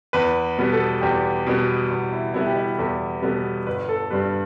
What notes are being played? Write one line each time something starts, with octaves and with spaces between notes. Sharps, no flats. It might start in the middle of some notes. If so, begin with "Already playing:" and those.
E2 B4
B2 G3 B3
A4
E2 G4
B2 G3 B3
E2
E4
B2 G3 B3 E4
G4
E4
E2 A4
B2 G3 B3 A4
G1 B4
A4
G2 G3 B4